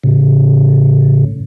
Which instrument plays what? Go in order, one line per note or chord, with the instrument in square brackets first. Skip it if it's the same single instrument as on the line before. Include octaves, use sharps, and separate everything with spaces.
[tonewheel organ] A2 C#3